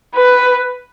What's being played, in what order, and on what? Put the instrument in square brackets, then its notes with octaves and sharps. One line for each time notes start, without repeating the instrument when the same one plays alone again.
[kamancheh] B4